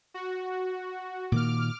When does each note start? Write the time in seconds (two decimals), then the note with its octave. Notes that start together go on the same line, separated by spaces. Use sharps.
0.14 F#4
1.32 A#2 D#3 A#3 D6 F6